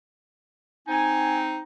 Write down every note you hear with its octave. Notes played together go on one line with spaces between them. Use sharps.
C4 D#4 G#5